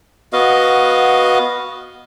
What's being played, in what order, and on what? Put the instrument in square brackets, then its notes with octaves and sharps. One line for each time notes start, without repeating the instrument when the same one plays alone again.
[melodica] B3 F#4 D#5 F5